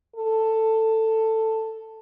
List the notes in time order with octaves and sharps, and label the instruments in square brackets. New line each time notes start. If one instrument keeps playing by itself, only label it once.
[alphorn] A4